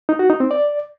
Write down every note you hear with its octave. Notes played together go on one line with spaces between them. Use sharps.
D#4
F#4
D#4
C4
D5